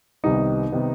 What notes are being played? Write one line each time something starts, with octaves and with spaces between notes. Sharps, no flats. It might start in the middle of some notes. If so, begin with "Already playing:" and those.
C2 C3 D#3 G3 B3 D#4
C3 D#3 G3 B3